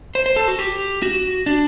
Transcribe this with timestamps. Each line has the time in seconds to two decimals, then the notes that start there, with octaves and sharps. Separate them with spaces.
0.15 C5
0.26 C5
0.36 A4
0.48 F#4
0.59 G4
1.02 F#4
1.46 D4